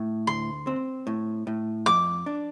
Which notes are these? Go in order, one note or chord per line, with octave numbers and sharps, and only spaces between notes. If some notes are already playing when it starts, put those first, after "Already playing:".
Already playing: A2
D2 C6
C4
A2
A2
F2 D6
D4